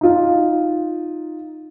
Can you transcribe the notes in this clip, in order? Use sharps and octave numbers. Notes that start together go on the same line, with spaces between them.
D#4 F4